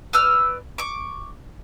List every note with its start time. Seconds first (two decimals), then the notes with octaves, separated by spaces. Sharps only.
0.13 B4 D5 E6 F6
0.78 C#6 D6